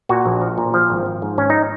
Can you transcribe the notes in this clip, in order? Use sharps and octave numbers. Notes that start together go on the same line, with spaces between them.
A#2 F#4
A#1
F3
A#2
F3
G#1
F3
G#2
G#1 C#4
D#4